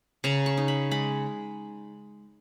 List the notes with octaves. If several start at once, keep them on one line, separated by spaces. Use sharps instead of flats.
C#3 A#5
C#6
D#4
B5
G#3 B5